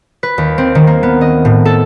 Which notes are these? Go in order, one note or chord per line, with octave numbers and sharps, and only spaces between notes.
B4
D#2
C4
D#3
A#3
B3
D#5
A2
A4